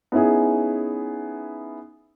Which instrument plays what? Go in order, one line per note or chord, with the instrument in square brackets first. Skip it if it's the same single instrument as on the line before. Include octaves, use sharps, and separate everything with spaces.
[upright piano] B3 C#4 D#4 E4 G#4